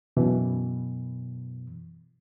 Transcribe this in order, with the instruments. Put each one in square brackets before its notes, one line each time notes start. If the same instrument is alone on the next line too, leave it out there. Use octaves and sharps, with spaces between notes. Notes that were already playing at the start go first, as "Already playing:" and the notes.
[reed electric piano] F#2 B2 E3